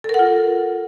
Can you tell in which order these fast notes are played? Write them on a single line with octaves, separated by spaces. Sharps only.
A4 A#4 F#5 F4